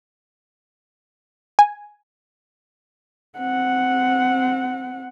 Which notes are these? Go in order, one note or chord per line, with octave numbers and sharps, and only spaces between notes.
G#5
C4 F#5